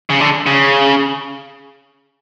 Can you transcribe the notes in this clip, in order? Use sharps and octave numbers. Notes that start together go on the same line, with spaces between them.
C#3
D3
C#3